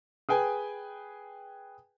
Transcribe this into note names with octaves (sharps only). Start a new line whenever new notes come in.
G#4 B4 G5 G#5